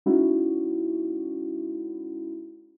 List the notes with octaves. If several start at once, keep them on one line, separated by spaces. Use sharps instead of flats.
G#3 C#4 D#4 E4 F#4